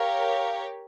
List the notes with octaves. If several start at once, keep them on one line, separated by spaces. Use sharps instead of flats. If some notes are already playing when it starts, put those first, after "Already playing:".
Already playing: G4 A#4 C#5 F5